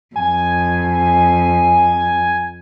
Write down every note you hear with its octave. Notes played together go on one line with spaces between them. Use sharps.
F2 G#5